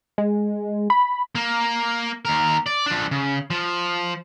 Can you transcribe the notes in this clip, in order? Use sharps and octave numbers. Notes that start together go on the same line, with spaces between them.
G#3
B5
A#3
D#2 A#4
D5
F3 D4
C#3
F3